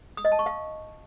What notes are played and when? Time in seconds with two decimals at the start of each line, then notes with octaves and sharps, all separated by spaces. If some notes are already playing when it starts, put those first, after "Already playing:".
0.17 D#6
0.25 D#5
0.32 A5
0.39 C#6
0.46 F5